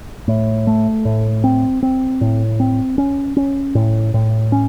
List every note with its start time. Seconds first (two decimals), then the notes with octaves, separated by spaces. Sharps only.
0.28 A2
0.67 A3
1.05 A2
1.44 C4
1.83 C4
2.21 A2
2.60 C4
2.98 C#4
3.37 C#4
3.75 A2
4.14 A2
4.52 C#4